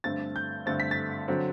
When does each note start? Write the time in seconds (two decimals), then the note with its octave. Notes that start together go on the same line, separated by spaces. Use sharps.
0.04 G2 D3 A3 C4 A6
0.36 G6
0.66 G2 D3 A3 C4 A6
0.80 B6
0.91 A6
1.28 D3 F#3 C4